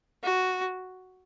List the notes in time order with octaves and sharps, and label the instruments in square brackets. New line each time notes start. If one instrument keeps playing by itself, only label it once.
[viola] F#4